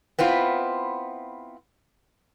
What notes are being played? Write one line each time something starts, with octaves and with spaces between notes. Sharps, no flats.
B3 C4 E4 F4